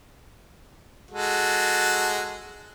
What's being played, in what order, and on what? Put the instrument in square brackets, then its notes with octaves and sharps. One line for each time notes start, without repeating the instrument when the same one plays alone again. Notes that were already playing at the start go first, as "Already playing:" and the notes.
[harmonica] G#3 F#4 A4